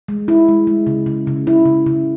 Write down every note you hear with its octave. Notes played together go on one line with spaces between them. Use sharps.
G#3
E4
G#3
G#3
C#3
C#3
C#3
E4
C#3
C#3